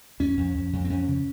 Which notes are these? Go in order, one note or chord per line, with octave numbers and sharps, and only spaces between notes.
F2 C#4
F2
F2
F2
C4
F2 C#4
C#3